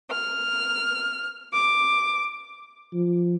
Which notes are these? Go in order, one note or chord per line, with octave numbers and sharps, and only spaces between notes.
F6
D6
F3